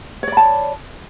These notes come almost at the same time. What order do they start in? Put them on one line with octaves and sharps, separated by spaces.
C#5 D5 B5 A5